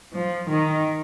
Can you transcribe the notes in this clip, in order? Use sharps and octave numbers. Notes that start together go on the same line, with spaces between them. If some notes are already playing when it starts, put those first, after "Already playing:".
F3
D#3